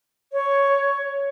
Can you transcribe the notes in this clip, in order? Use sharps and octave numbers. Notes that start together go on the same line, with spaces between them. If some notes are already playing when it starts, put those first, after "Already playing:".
C#5